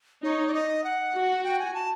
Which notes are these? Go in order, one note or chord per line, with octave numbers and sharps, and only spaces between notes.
D#4 C#5
D5
D#5
F#5
F#4
G5
G#5
A5